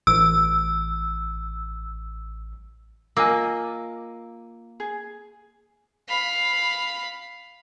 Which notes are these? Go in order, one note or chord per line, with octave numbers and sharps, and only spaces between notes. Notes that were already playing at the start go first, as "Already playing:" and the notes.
A1 E6
A#3 F4 D#5 G#5 D6 E6
G#4
F5 B5